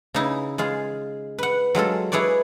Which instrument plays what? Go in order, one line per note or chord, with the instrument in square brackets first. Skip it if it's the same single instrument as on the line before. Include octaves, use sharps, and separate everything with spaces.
[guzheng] C#3 D#4 E4
G#3 F4 G#4
B4 F#5
F#3 G#3 F4 A4
E4 G#4 B4 C#5 D5